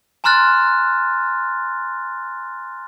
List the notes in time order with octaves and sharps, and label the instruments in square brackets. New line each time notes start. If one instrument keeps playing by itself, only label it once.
[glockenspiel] G#5 A#5 C6 F6 F#6 A6